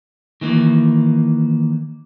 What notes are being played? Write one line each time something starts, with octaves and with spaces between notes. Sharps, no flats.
D#3 E3 A#3